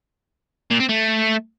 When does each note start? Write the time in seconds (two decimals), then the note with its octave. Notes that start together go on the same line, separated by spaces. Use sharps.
0.71 A#2
0.80 C4
0.89 A3